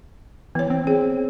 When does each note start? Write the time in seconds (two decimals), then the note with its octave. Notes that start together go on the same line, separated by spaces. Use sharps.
0.55 E3 B3 C#5
0.70 C4
0.87 C4 G#4